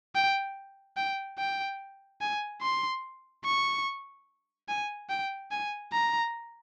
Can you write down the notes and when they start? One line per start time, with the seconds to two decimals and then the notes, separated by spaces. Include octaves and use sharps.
0.15 G5
0.97 G5
1.38 G5
2.21 G#5
2.62 C6
3.45 C#6
4.68 G#5
5.09 G5
5.51 G#5
5.92 A#5